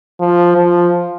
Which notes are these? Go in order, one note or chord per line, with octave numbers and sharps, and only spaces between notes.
F3
F3